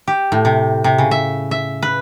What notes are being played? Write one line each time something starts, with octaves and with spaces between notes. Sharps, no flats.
G4
A2
C3
C3
C#3
E5
E5
B4